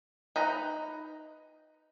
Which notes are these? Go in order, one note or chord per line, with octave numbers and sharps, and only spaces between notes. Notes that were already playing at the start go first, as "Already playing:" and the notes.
D#4 B4 A#5